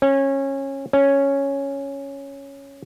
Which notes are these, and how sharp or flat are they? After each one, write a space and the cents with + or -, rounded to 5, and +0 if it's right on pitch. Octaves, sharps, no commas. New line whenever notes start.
C#4 -20
C#4 +0